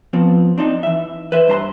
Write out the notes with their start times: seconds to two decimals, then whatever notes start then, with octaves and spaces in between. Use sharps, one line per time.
0.13 F3 B3 C4
0.58 C4 D4 D#4
0.83 E3 E5
1.32 B4 C5 E5
1.48 G2 C5 A#5 C6